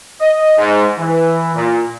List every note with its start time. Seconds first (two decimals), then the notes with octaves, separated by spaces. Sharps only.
0.21 D#5
0.57 G#2
0.98 E3
1.55 A#2